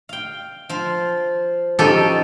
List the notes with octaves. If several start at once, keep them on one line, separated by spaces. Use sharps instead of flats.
F5 G5
F3 C5 F5
F3 C#4 D#4 G4 A4